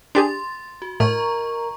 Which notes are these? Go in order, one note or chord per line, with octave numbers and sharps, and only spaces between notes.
D4 G4 G#4 C6 A6
F#4
A2 A#4 D#5 A#5 C#6